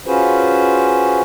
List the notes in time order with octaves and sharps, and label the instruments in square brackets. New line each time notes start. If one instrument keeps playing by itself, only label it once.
[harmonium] C#4 F4 F#4 G#4 B4 C5